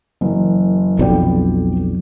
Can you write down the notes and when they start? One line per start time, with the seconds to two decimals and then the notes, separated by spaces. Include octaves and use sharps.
0.21 F#1 F#2 E3
0.99 B1 F2 B3 D5 G5